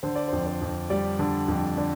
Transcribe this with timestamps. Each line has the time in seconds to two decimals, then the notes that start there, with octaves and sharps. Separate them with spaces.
0.03 D3 C5
0.16 D5
0.28 F2 C5
0.47 C5
0.61 F2
0.90 G3 D5
1.19 D3
1.48 F2
1.77 D3 D5